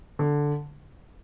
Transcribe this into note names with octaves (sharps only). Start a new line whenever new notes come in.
D3